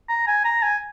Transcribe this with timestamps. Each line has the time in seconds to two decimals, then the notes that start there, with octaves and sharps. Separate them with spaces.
0.09 A#5
0.27 G#5
0.45 A#5
0.63 G#5